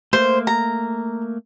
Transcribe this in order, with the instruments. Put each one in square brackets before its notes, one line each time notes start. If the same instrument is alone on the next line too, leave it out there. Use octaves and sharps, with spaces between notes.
[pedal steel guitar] A3 A#3 [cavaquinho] C5
[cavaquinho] A#5